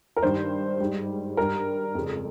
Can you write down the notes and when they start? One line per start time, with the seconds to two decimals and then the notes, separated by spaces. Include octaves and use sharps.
0.17 A#4
0.23 G2 D#3 G3 C5
0.80 G#2 G3
1.37 G2 G3 A#4
1.95 F2 C#3 G#3